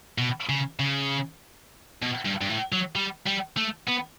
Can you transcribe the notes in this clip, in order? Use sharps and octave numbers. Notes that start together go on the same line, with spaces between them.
B2
C#3
C#3
B2
G2
G2
A2
F#3
G3
G3
A3
B3